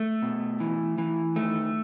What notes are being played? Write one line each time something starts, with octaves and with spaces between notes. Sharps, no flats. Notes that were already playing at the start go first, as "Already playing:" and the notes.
Already playing: A3
B2
E3
E3
D#3 A3